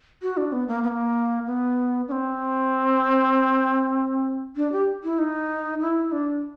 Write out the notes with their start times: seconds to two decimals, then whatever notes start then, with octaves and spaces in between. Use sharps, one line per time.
0.22 F#4
0.37 D4
0.52 B3
0.68 A#3
0.83 B3
0.88 A#3
1.46 B3
2.08 D4
2.12 C4
4.56 D4
4.72 G4
5.04 E4
5.19 D#4
5.81 E4
6.12 D4